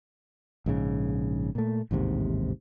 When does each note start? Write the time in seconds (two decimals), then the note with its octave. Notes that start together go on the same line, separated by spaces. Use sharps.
0.66 A#1 G#2 C#3
1.55 A#2 A3
1.91 A1 D#2 G#2 C3